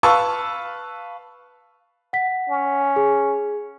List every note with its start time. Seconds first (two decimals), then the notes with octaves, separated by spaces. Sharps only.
0.03 B4 F5 A5 C#6 E6
2.13 F#5 B6
2.49 C#4
2.96 G#4